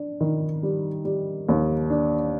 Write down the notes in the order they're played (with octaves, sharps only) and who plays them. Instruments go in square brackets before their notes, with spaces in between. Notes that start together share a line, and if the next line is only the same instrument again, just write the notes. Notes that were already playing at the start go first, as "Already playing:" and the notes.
Already playing: [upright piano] D4
D#3
G3
G3
D#2
D4